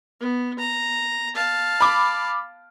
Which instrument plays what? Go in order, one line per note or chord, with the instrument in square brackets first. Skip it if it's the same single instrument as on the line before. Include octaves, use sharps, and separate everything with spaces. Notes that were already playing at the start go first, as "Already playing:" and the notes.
[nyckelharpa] B3
A#5
F5 A5
[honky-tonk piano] B5 D6